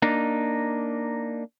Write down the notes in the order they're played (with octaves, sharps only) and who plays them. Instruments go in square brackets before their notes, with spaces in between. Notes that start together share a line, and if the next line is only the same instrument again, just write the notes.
[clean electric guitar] A#3 D4 D#4